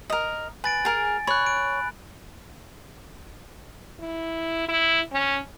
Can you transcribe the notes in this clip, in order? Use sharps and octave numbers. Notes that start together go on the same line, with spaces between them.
A#4 D#5
B4 G#5 A6 D7
G#4 A#4
C#5 B5 F#6
D7
E4
E4
C#4